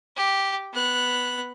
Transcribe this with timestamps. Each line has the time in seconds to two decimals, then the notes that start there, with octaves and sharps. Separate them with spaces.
0.16 G4
0.73 B3 F#6